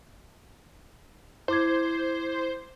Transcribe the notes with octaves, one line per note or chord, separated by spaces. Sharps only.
E4 C5 D6 G#6